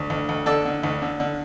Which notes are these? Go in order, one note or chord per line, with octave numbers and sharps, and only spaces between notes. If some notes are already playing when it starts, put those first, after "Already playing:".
Already playing: D2
D2
D2
D3 A4 D5
D3
D2
D3
D3